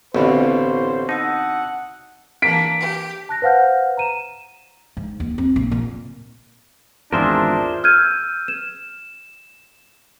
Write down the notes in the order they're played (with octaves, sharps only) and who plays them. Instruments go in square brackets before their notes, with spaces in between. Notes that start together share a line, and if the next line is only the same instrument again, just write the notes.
[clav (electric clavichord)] A1 [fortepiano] B2 D3 C4 [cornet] C5 [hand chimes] F5 B5 C#6
[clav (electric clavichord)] D#4 [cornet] F#5 [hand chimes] A5 D#6 E6
[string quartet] E3 A#3 D4 [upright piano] B6 D7
[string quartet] G4
[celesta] A5 F#6 A#6
B4 C5 F5 F#5 F6 G6
A#5 D#7 E7
[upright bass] G#2
D#2
C4
A#1
A#2
[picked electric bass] G#1 E2 [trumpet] D4 [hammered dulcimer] F4 G#4 [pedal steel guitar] A#4 C5 E5
[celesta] E6 F6 G6 G#6 D#7
E7